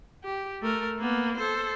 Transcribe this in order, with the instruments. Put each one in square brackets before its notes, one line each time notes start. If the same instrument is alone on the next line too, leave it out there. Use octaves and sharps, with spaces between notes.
[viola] G4
A3 A#4
A#3 B3
A4 C5